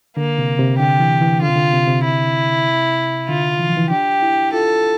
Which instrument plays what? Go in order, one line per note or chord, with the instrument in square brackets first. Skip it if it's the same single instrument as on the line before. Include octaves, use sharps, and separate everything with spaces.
[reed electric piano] D3 [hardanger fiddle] A#3
[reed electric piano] C3
C3
[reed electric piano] D3 [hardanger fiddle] G4
[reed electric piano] E3
E3
[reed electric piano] D3 [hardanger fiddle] F4
[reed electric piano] C3
D3
C3
C3
[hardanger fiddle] E4
[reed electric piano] D3 [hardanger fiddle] F4
[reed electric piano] E3
F3
E3
[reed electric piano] D4 [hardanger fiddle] G4
[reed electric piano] E4
[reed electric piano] F4 [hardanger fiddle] A4